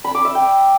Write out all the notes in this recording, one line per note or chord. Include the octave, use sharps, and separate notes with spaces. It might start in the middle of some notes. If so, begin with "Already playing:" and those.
B5
D6
E5
G5